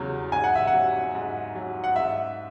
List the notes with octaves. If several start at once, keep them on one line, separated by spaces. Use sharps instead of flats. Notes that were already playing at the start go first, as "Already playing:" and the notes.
Already playing: E2 C#3 F#3
G#2 G#5
F#5
E5
F#5
F#3
G#2
F#3
F#5
G#2 E5